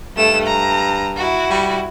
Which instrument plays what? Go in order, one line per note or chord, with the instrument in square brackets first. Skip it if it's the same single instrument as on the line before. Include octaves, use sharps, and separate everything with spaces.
[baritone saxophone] G2 [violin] A3 E7
[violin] A#5
E4 F#4
[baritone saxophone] G3